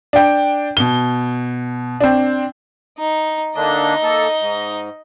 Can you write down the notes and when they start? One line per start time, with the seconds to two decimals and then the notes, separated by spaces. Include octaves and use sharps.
0.13 D4 G5
0.77 B2 G7
2.00 C4 D4
2.99 D#4
3.56 D3 A#3 D4 D#4 D#5
4.03 A#3 A4
4.39 G#2